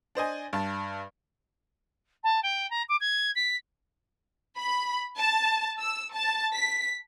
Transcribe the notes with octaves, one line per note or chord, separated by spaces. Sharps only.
D4 C5 D#5 G#5
G2 A5
A5
G5
A#5
D6
G#6
B6
B5
A5
E6
A5
B6